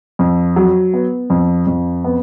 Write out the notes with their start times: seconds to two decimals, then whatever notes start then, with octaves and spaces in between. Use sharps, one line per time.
0.19 F2
0.56 F#3
0.94 B3
1.30 F2
1.67 F2
2.04 B3